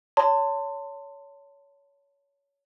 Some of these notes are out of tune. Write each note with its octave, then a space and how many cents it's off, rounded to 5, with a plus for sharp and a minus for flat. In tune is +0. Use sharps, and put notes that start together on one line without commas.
C#5 +20 A5 +30 C6 -15